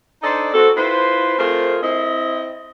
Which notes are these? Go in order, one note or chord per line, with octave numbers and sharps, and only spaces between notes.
D4 D#4 A4 C5 D5 D#5
C4 F#4 A4
E4 F4 B4 C5
A3 C4 F4 G#4 A#4 C5
C4 E4 D#5